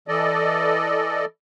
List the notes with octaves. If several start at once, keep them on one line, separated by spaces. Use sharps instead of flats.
E3 A4 D5 D#5